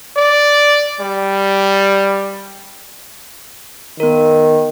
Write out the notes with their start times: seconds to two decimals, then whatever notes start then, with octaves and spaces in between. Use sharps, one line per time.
0.17 D5
1.00 G3
4.00 D#3 B3 A#4